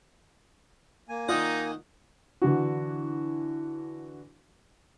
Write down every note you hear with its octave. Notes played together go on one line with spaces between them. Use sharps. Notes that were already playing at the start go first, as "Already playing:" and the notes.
A#3 G#5
D#3 D#4 F4 D5 D#5 F#5
D3 E3 D4 F#4